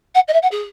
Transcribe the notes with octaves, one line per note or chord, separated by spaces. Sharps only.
F#5
D#5
E5
F#5
G#4